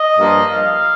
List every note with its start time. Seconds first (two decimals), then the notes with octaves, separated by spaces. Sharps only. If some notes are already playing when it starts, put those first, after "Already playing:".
Already playing: D#5
0.18 G2 F3 A#3
0.52 F5